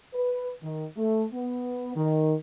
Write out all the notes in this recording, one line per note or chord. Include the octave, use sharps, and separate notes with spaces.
B4
D#3
A3
B3
D#3